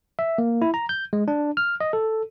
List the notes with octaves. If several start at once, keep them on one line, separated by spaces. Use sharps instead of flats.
E5
A#3
E4
A#5
G6
G#3
D4
F6
D#5
A4